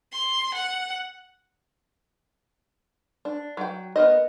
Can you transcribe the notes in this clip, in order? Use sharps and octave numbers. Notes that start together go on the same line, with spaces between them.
C6
F#5
D4
F#3 G5
B3 A#4 C5 D#5